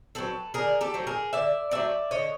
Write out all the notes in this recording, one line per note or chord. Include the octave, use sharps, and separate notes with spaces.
F#3 A3 C4 A4 B4
D3 G#4 A#4
G4 A4
F#3 A3 C4
G#4 A#4
D3 D5 E5
F#3 A3 C4 D5 E5
D3 C#5 D#5